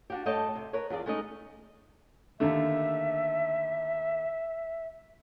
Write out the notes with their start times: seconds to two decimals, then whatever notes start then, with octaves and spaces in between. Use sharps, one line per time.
0.10 D4 F#4 G4
0.26 G2 A3 C#5 D#5 G5 A5
0.56 C3
0.73 A#4 B4 C#5
0.90 E2 F4 G#4 D5
1.06 G#3 A3 C#4 D#4 D#5
2.40 D#2 D3 A3 E5